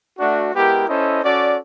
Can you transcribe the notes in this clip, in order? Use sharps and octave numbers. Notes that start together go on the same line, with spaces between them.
A3 D4 F#4
G#3 B3 E4 G4 A#4
C#4 E4 A4 C5 D#5
C#4 F#4 A4 D5